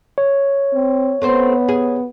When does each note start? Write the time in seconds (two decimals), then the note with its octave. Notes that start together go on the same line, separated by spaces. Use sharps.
0.18 C#5
0.74 C4
1.22 A3 B3 C4 C5
1.69 G#4